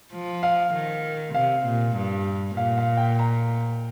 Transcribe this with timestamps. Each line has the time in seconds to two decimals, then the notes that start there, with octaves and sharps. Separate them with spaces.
0.13 F3
0.43 F5
0.74 D#3
1.34 C3 F5
1.66 A#2
1.97 G2
2.57 A#2 F5
2.78 F5
2.97 G5
3.19 A#5